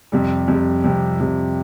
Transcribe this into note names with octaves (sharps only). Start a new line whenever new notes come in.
F2 C3 G3
F2 C3 G3
F2 C3 G3
F2 C3 G3